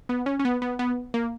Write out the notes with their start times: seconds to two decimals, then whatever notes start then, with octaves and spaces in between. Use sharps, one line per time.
0.09 B3
0.26 C#4
0.39 C#4
0.45 B3
0.62 B3
0.79 B3
1.14 A#3